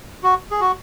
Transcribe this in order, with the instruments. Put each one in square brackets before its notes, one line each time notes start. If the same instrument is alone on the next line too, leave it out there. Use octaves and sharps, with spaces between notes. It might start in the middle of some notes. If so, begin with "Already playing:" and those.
[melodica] F#4
G#4
F#4